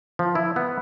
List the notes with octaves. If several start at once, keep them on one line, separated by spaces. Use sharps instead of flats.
F3
E4
B3